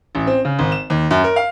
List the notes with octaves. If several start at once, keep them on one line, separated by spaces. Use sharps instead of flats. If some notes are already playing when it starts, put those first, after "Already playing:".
A1
C4
C#3
G#1
E7
D#2
F#2
A#4
F5